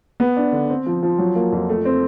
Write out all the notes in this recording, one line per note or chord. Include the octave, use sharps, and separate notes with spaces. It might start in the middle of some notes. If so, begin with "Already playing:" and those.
B3
D4
D3
C4
F3
F3
F#3
A#3
F2
A3
C4